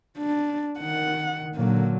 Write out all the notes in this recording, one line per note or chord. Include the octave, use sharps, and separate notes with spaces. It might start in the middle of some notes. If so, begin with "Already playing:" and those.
D4
D#3 F#5
A#2 D3 F#3 A#3